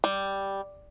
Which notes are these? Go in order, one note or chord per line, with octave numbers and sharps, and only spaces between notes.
G3